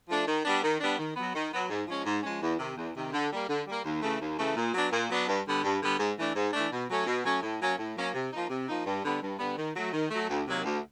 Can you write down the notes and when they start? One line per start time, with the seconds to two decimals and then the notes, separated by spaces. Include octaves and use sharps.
0.09 F3 A3 D4
0.26 D#3
0.45 G3 B3 D4
0.63 D#3
0.80 G3 B3 D4
0.98 D#3
1.16 F#3 B3
1.35 D#3
1.52 F#3 B3
1.70 G#2
1.87 F3 G#3 C#4
2.05 G#2
2.23 F3 G#3 C#4
2.41 E2
2.59 C3 D#3
2.77 E2
2.95 C3 D#3
3.13 D3
3.31 G3 A#3
3.48 D3
3.66 G3 A#3
3.84 D#2
4.02 C#3 E3 A3
4.21 D#2
4.39 C#3 E3 A3
4.56 A#2
4.74 F#3 B3 D4
4.92 A#2
5.09 F#3 B3 D4
5.27 G2
5.46 D3 G3 B3
5.64 G2
5.81 D3 G3 B3
5.99 G#2
6.18 E3 A3 D4
6.35 G#2
6.53 E3 A3 D4
6.71 B2
6.88 F#3 A3 C#4
7.07 B2
7.24 F#3 A3 C#4
7.43 A2
7.60 F#3 A#3 C#4
7.79 A2
7.96 F#3 A#3 C#4
8.14 C3
8.32 F3 A#3 D#4
8.49 C3
8.68 F3 A#3 D#4
8.86 G2
9.03 D3 G3 B3
9.22 G2
9.39 D3 G3 B3
9.57 D#3
9.75 F#3 A3
9.93 D#3
10.10 F#3 A3
10.29 D2
10.47 C3 D#3 F#3 A#3
10.64 D2